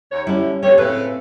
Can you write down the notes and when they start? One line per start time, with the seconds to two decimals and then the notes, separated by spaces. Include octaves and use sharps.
0.12 D#2 C#5
0.27 D3 G3 C#4 E4
0.63 B2 D3 A3 G4 C#5
0.78 A2 C#3 C4 A4 B4